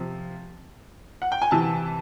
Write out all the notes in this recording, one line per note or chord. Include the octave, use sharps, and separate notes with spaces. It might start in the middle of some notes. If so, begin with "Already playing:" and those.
Already playing: C3 F3
F#5
G5
G#5
C3 E3 A5